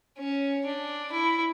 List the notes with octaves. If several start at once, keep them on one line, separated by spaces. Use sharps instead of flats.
C#4
D4
E4